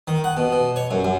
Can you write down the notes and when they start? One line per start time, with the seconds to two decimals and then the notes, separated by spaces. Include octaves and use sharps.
0.07 D#3
0.24 F#5
0.37 B2
0.52 B2
0.76 C#5
0.91 F#2
1.04 F#2